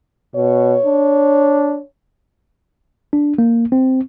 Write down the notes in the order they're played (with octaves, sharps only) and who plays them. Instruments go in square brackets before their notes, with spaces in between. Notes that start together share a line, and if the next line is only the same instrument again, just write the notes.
[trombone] B2 [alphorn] C#5
[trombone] D4
[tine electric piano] D4
A#3
C4